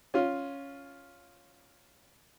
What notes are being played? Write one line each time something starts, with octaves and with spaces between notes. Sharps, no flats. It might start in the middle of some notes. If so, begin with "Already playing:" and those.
C#4 F4